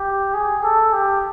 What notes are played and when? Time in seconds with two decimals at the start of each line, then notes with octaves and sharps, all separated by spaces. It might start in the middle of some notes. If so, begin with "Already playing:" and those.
Already playing: G4
0.34 G#4
0.63 A4
0.93 G4